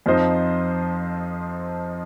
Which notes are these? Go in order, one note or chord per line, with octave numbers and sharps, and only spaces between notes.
F2 F3 D#4 C5 D#5